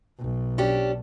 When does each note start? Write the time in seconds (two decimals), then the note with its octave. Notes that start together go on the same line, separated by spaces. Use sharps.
0.19 B1
0.58 C#4 D4 G4